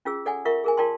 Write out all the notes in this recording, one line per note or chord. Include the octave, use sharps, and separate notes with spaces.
C#4 F4 G#4 E6
A4 D5 F#5 G#5
F4 A#4 E5 F#5 C#6
G#4 A#4 G#5
F4 A#4 D5 G5 A5 C6